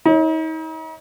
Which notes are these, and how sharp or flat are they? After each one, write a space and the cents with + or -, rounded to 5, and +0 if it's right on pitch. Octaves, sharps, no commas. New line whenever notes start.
D#4 +40 C#5 +0